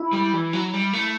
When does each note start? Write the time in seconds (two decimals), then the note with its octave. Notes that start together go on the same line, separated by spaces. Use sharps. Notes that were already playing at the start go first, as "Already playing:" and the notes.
Already playing: E4
0.13 G3
0.33 E3
0.53 F#3
0.73 G3
0.93 A3